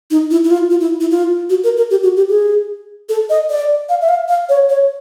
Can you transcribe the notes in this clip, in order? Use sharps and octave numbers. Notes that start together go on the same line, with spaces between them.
D#4
E4
E4
F4
F4
E4
E4
F4
F#4
A#4
A#4
G4
F#4
G4
G#4
A4
D#5
D5
F5
E5
F5
F5
C#5
C#5